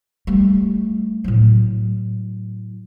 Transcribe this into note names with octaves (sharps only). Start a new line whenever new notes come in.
G3 A3
A2 F#3